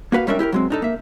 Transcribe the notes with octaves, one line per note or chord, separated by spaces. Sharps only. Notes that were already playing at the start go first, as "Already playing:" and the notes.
A#3 F#4 B4 F5
G3 G#3 C#4 D4 A#4 E5
E4 G4 G#4 A#4
F#3 G#3 C4
D4 D#4 A4
A#3 E5